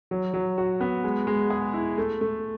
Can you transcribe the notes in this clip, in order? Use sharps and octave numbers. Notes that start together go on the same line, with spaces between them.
F#3
F#3
F#4
B3
G#3
G#3
G#4
E4
A3
A3